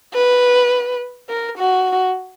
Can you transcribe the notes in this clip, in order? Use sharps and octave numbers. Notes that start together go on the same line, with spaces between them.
B4
A#4
F#4